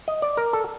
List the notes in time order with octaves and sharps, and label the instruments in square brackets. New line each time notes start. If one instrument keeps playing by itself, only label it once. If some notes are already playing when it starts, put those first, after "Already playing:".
[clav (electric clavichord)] D#5
D5
A#4
A4